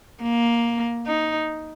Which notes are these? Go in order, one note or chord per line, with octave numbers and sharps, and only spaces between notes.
A#3
D#4